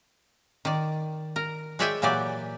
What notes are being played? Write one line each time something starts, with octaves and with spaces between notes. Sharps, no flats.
D#3 D5
A#4
G#3 C#5 D5 E5 G5 G#5
A#2 E3 F#3 G4 D5